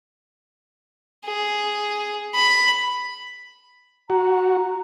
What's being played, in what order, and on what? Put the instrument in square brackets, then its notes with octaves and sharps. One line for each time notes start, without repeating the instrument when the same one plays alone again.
[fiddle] G#4
B5
[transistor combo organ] F#4 [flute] A#5